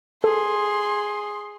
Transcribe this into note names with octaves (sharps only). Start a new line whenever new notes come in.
G#4 A4 C6